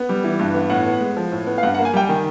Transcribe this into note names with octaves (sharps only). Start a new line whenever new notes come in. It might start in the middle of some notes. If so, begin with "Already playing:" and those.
Already playing: B3
G3
E3
G2
B3
A2 F#5
B3
G#3
F3
A2
B3
F5
G2 F#5
F#5
A#3
G#5
G3 G5
D#3